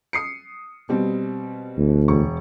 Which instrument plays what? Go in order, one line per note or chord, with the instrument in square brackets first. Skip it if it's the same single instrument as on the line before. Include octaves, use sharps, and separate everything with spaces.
[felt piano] D#6 C7 C#7
B2 G3 C4
[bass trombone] D2
[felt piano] E1 C#6